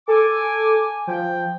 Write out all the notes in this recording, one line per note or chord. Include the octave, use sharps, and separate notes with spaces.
A4 G#5 D6
F3 G5